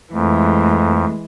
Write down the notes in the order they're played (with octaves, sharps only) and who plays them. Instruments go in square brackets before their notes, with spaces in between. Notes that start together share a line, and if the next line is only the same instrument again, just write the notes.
[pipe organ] F2 [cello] E3 G#3 [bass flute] A3